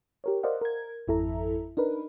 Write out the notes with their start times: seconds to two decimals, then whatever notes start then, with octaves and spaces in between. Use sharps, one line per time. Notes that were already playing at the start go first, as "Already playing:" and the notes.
0.24 G4 A#4 C#5
0.43 A#4 C5 D5 D#5 F5 F#5
0.61 A#4 G#6
1.08 G#1 F2 E4 A4 E5 A#5
1.77 D4 D#4 A#4 B4